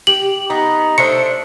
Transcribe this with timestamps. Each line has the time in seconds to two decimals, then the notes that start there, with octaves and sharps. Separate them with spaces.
0.07 G4 F#7
0.50 B3 D#4
0.98 A3 D4 A4 C5 C#7